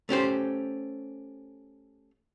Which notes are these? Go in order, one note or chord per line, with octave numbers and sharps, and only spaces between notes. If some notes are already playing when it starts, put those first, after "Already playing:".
A3 C#4 G4 C5